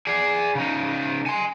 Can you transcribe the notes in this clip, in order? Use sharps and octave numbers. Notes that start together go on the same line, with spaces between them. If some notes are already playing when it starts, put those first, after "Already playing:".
G#4 D5
C#3 D#4
G#5 C6